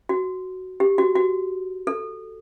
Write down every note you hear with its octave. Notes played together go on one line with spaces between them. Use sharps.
F#4
G4
F#4
F#4
A4